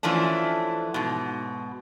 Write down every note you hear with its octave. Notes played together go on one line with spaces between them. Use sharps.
E3 F3 A3 C#4 D4
G#2 B2